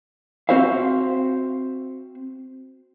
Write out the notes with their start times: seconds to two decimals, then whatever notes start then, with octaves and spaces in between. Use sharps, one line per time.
0.49 C4 F#4 C5 E5 F5